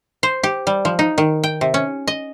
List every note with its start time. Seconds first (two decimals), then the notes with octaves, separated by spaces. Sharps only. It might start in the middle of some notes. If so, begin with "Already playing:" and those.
0.23 C5
0.43 G4
0.67 G3
0.85 F3
0.99 D#4
1.18 D#3
1.44 G5
1.61 C3
1.74 C#4
2.07 D#5